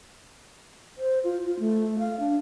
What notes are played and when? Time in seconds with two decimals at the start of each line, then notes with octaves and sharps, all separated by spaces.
0.98 C5
1.24 F4
1.45 F4
1.59 A3
1.99 F5
2.20 D4